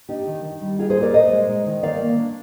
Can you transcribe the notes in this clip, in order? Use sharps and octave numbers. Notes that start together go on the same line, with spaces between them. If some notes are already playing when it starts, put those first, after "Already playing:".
D4 D#4 G4
D#3
D#3
G3
D#4 F4 G#4
G#4 C5
A#2
A#4 D5
A#2 C5 D#5
G#3
D#4
D#3
D#3 D5 F5
A#3
D4